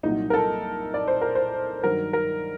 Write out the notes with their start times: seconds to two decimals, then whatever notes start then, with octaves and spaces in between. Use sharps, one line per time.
0.03 C2 A#2 F#3 D#4
0.30 A#4
0.33 A4
0.94 D5
1.08 C5
1.21 A#4
1.35 C5
1.83 G2 D#3 F#3 A#4
2.13 A#4